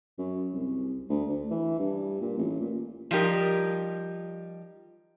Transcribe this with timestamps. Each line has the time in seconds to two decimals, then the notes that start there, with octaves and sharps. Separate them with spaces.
0.19 F#2
0.53 C2
1.09 D2
1.29 D2
1.51 E3
1.79 G2
2.21 A#2
2.38 A1
2.61 A#2
3.11 F3 G3 D#4 G4 A#4